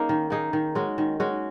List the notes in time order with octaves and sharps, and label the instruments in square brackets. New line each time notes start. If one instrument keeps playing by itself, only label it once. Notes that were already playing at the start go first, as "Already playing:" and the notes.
Already playing: [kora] A#3 C#4 D#4 G#4
D#3
A#3 D#4 G#4
D#3
G#3 C#4 F#4
D#3
G#3 C#4 F#4